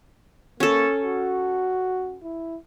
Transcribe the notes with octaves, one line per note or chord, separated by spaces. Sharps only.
A#3 C#4 A4
F#4
E4